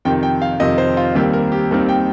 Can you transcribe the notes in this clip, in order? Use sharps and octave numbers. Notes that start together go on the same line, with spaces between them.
F2 C3 D#3 G5
G5
F5
F2 C3 D#3 D#5
C5
F4
D#2 D#3 G3 C4 G4
A#4
G4
D#2 D#3 G3 C4 A#4
G5